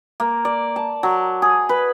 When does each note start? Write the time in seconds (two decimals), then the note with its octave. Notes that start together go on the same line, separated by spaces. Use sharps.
0.20 A#3
0.45 D5
0.76 A5
1.03 F#3
1.42 G#4
1.69 B4